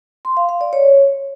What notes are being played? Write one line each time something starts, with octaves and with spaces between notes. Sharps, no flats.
C6
F5
F5
D5
C#5